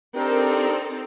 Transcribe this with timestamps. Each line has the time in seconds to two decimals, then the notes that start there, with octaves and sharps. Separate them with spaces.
0.15 C4 D4 D#4 G4 A4 A#4